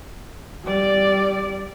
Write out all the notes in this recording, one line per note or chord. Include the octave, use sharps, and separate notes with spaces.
G3 D5